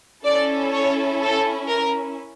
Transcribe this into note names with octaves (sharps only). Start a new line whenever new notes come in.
C#4 E4 A4 D5
C#5
A4
A#4